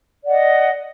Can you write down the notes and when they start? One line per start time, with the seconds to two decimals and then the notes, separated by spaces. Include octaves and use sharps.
0.23 D5
0.26 F#5
0.29 D#5